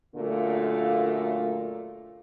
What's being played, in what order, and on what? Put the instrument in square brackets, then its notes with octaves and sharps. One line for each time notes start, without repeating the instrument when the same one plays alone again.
[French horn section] F#2 A#2 D3 A3 A#3 F4